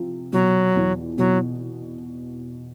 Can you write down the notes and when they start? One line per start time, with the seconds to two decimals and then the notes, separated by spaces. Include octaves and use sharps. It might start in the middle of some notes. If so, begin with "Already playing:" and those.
Already playing: C3 F3
0.33 B2 F#3
0.76 E2
1.18 B2 F#3